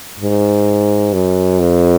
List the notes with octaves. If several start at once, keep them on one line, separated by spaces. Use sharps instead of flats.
G#2
F#2
F2